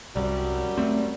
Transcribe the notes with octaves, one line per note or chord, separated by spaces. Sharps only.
C2 F#2 F#3 G3
A3 C4